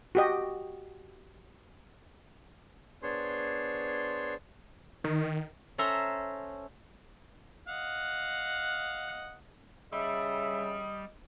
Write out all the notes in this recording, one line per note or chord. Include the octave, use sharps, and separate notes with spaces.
F#4 G4 D#5
B3 D4 G#4 C5 C#5 C6
D#3
C#4 A4 C5 E5 A#5 C6
D#5 F5 F#5
C#3 G3 D#5 E5